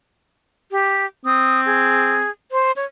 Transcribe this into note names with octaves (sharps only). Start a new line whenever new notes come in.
G4
C4 D#6
G#4
C5
C#5